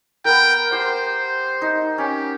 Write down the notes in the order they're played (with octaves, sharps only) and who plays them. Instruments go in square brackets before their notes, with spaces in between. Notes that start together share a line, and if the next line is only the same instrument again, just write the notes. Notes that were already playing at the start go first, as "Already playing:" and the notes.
[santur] B3 A#4 [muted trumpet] G5
[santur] G4 [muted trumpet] C5
[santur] D#4
[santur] C#4 [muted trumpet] G4